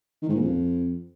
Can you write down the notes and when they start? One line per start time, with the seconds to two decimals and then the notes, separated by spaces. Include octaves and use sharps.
0.23 D#3
0.29 G#2
0.35 A#2
0.41 F2